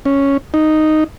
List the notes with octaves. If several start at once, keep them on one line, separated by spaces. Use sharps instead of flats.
C#4
D#4